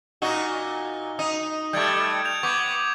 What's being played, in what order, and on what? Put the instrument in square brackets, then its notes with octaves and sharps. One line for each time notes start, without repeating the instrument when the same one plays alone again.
[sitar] A#2 D#4 F#4 [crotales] G7
[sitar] D#4 [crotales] D#6
[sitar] G3 A3 [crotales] G6 G#6 D7
[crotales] G6 F7
[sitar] B3 [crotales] C#6 D6 G#6